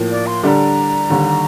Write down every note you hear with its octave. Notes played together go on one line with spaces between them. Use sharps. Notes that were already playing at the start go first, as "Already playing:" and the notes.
Already playing: A2 F3 A#3
D5
C6
D3 G3 D4 A4 A#5 C6
D#2 D3 G3